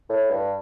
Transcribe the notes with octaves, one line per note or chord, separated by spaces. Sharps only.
A2
G2